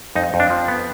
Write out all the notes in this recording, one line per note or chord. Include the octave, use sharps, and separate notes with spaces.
F2 D#4
F2
D4
F3
B3